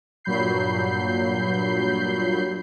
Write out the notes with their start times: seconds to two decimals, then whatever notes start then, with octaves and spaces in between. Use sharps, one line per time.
0.25 G2 A#2 F#3 B5 G6 C7